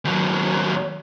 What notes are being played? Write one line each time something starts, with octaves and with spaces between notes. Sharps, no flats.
D#2 F#3